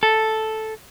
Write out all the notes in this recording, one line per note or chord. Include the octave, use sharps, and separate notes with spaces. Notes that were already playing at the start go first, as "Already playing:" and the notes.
A4